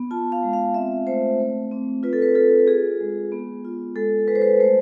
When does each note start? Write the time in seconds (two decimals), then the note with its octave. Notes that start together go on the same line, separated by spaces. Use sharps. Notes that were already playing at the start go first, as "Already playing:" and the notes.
Already playing: B3
0.11 F4 A5
0.32 F5
0.43 G#3
0.53 F5
0.74 C4 E5
1.07 A3 C5
1.40 A3
1.72 C4
2.03 F4 B4
2.13 A4
2.22 B4
2.35 F4 A4
2.67 F4 G#4
3.00 G#3
3.32 B3
3.65 F4
3.95 G#3 A4
4.28 G#3 B4
4.35 C5
4.42 B4
4.60 A3 C5